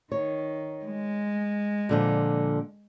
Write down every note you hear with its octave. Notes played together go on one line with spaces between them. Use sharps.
D#3 C#5
G#3
A#2 D3 F3